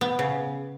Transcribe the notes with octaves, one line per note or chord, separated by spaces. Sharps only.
B3
C#3